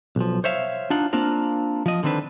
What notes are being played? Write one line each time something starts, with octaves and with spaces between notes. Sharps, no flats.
B1 F3
C5 C#5 E5 F5
D4 D#4 F4 F#5
A#3 C4 D4 F4 A#4
F3 D#5
D3 D#3 C4 D4 B4